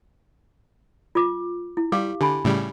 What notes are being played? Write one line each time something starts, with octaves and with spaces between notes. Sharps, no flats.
F4 D6
E4
G3 G4 F5 D6
D3 G4 G#5 B5
A2 C#3 G3